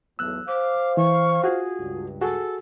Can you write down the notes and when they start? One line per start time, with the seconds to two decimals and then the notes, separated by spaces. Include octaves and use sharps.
0.19 B1 E2 A2 E6 F#6
0.48 C5 F5 D6
0.97 E3 C#6
1.44 F4 F#4 G#4
1.78 C#2 G2
2.21 F#4 G#4 A4